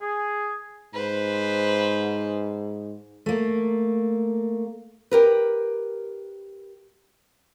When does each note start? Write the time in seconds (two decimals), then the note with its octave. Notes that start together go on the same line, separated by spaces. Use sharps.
0.02 G#4
0.94 G#2 B4 C5
3.26 A3 A#3
5.11 G4 A#4 B4